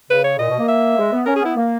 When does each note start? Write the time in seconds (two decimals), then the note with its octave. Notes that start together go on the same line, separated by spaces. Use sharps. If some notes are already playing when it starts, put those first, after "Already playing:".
0.09 C#3 B4
0.24 C#5
0.39 A#2 D#5
0.49 B2
0.59 A#3
0.68 E5
0.97 G#3
1.12 B3
1.26 C#4 A#4
1.36 G#4
1.41 B3 E4
1.56 A#3